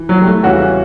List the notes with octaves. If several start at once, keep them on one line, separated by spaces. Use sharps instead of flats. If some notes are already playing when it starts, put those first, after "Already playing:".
Already playing: E3
F#3
G3
A3
E2 C#3 E3 G3 C#4 F#4